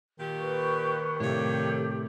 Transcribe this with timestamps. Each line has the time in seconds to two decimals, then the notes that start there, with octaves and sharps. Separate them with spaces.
0.19 A#2 D#3 G4
0.38 B4 C#6
1.20 F2 A2 C3 D4 G4 A4 C#5